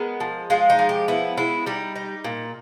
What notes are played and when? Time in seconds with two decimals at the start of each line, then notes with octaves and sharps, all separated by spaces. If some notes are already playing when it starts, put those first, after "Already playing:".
Already playing: G#3 B3 A#4
0.20 F3
0.50 G#3 F4
0.70 D#4
0.79 F3
0.89 G4
1.08 B3 E4
1.38 G#3 E4
1.66 G3 D#4
1.96 D#4
2.24 A#2